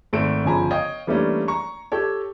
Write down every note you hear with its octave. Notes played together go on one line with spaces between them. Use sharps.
G#1 A3 C4 A4 D7
G1 C#3 F3 G#5 A#5 B5
C#5 D#5 F5 G5
E3 G3 A3 A#3 C#4 D4
A#5 C#6
G4 A4 C#5